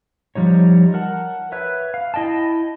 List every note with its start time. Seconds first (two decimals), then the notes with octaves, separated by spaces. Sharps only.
0.35 F3 G3 D#4 C#5
0.94 A#4 F#5 A5
1.52 B4 C#5 E5
1.94 F5
2.14 E4 D#5 G5 A5